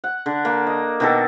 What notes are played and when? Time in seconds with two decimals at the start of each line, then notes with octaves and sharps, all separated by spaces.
0.04 F#5
0.26 D3
0.45 A#3
0.67 D#5
1.00 B2 D#3 A4